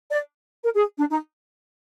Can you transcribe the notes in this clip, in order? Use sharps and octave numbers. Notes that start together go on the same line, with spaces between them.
D5
A#4
G#4
D4
D#4